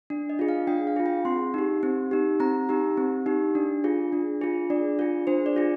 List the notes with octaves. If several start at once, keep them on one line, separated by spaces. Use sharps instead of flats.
D4
D#5
F4 G#4
F5
D4 G5
F5
F4 G#4
G5
C4 C6
D#4 G4
C4
D#4 G4
C4 A#5
D#4 G4
C4
D#4 G4
D4
F4 G#4
D4
F4 G#4
D4 D5
F4 G#4
D4 C5
D5
F4 G#4